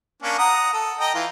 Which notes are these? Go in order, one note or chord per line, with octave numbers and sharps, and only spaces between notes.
A#3 C#4 D4
F#5 A#5 D#6
A4
D#5 G5 A#5
E3 F4